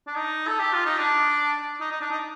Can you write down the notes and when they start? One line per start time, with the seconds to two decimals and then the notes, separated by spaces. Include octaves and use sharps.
0.07 D4
0.16 D#4
0.47 A4
0.60 G4
0.73 F4
0.86 D#4
0.98 D4
1.80 D#4
1.91 D#4
2.01 D4
2.11 D#4